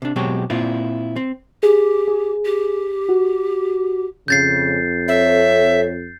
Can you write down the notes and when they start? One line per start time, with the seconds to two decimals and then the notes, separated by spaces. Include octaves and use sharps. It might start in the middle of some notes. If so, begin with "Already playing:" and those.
0.02 C3 D4
0.16 B2 F#3 G#3 C4 F#4 G4
0.50 A#2 C4 E4 F4
1.16 C4
1.63 G4 G#4
2.08 G#4
2.45 G4
3.09 F#4
4.28 F2 C#3 G6 A6 C7
5.08 C4 A4 C#5 E5